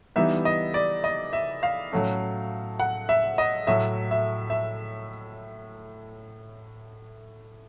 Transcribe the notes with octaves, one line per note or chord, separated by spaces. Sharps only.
E3 G3 B3 D#4 E5
D#5
D5
D#5
E5
F5
A2 F#3 A3 C#4
F#5
E5
D#5
A2 F#3 A3 E5
E5
E5